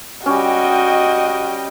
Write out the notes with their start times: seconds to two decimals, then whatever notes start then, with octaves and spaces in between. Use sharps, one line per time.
0.26 G3 C#4 F#4 D#5 G5